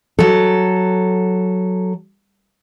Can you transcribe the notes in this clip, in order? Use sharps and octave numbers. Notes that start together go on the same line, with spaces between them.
F#3 A4